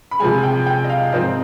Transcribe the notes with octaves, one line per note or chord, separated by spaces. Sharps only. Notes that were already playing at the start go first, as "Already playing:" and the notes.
B5
C3 F3 G#3 G#5
G5
G5
D#5
F5
G#2 F3 C4 D#5